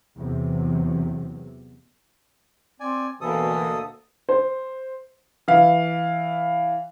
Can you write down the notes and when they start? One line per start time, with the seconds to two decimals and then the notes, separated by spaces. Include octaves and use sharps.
0.17 E2 C3 F#3
2.80 C4 D5 G#5
3.21 D2 B2 E3 A#3 A4 D#6
4.29 C5
5.48 E3 F5